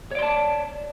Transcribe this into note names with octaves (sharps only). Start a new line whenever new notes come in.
C#5 D5 A5 C6